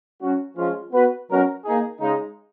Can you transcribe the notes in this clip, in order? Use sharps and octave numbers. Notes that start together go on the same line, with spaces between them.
F#3 C#4 F#4
F3 G#3 C#4 F4
B3 F#4 B4
B2 F#3 C#4 F#4 A#4
A#3 D#4 G#4
C#3 G#3 D#4